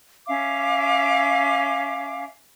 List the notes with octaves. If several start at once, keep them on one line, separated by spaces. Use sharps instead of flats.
C#4 E5 F5 D6